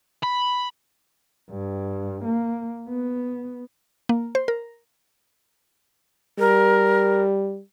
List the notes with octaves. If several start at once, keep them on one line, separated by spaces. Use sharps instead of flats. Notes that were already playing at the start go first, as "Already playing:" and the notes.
B5
G2
A#3
B3
A#3
C5
A#4
G3 A#4